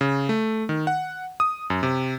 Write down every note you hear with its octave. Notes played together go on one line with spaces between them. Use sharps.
C#3
A3
D#3
F#5
D#6
F#2
C3